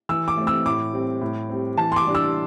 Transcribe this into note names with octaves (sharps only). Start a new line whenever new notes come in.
E3 E6
D6
A3 C4
E6
A2 D6
G3 C4
A2
G3 C4
E3 A5
C6
D6
G3 D4
E6